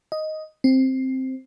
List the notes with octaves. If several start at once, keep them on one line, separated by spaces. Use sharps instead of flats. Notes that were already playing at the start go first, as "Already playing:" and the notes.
D#5
C4